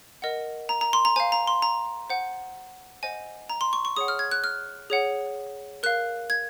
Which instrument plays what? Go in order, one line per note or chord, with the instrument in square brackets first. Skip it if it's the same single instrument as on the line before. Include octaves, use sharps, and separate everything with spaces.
[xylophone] A#4 D#5 F#5
A#5
A#5
C6
A#5
C5 F5 G#5
A#5
C6
A#5
C5 F#5
C5 D#5 F#5 G#5
A#5
C6
C#6
C#6
G#4 C#5 F#5 D#6
F6
G#6
F#6
F6
G#4 C#5 F#5
A#4 F5 F#6
G#6